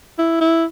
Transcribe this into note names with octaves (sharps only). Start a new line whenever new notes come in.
E4
E4